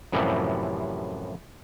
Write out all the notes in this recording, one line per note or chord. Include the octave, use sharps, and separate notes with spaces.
F#2 A2 C3 E3 F3 G3